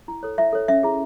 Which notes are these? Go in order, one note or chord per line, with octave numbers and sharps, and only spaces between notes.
E4
A4 C#5
E4 E5
A4 C#5
C#4 E5
E4 G#4